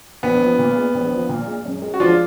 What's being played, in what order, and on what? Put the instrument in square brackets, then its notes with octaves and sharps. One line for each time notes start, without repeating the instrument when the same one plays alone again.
[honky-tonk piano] A#1 [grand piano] B3
[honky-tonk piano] F3
A#2
G#3
A#1
F3
A#2
G#3
F#2
G#3
[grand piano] F#4
[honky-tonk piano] F3 [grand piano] D4 F4